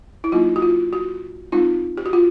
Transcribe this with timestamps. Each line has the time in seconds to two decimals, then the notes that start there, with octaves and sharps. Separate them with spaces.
0.24 E4
0.32 F#3 A#3 D#4 F4
0.56 F#4
0.62 F4
0.93 F#4
1.52 G#3 C4 D#4 F4
1.97 G4
2.06 F#4
2.13 F4